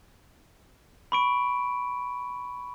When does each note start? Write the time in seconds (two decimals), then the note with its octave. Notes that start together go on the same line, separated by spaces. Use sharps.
1.12 B5 C#6 D7